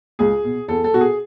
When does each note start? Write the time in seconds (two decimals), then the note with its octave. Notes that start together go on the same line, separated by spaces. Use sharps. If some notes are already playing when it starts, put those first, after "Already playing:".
0.19 C#2 G#4
0.44 B2
0.68 E2 A4
0.84 A4
0.93 B2 F#4
1.01 G#4